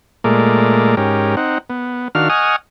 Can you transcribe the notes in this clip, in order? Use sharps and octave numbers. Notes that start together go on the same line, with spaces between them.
A#2 G#3 A3 A#4 D5
G#2 C#4 G4 A#4
C4 D#4 F#5
B3
D#3 D4 F#4 F5 F6
D#5 F#5 G#5 C#6 D#6 F6